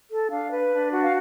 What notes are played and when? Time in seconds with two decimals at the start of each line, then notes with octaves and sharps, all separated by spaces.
0.10 A4
0.30 D4 F5
0.51 B4
0.71 D4
0.91 F#4
1.02 F5